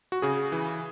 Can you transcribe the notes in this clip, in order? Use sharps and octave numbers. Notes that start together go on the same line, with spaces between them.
F#4
C#3 G#4
E3